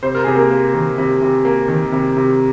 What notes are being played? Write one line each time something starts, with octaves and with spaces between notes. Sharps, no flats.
C3 C5
A#4
C3 G#4
A#3 A#4
A#3
D#3
C3
C3
A#3
D#3
C3
C3